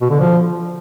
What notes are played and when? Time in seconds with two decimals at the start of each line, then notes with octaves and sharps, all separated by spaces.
0.01 B2
0.10 D3
0.19 F3